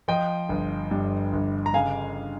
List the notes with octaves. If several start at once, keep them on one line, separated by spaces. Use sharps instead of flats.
F3 D#5 G5
G1
G2
G1
A#5
C#3 F5 G#5